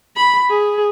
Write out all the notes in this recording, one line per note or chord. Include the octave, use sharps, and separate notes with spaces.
B5
G#4